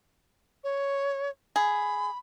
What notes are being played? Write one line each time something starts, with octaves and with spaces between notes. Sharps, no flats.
C#5
G#4 B5